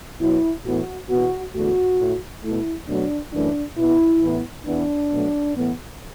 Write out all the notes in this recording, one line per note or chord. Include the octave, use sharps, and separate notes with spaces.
B2 F#3 B3 E4
A2 E3 B3 F#4
E2 B2 B3 F#4
E2 D3 A3 F#4
A2 A3
B2 A3 E4
B2 F#3 A3 D4
F#2 E3 A3 D4
B2 B3 E4
A2 E3 B3
E2 E3 B3 D4
B2 F#3 A3
A2 E3 B3